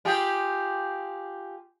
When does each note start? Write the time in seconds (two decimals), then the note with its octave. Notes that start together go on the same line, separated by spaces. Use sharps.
0.05 F4 G4 G#4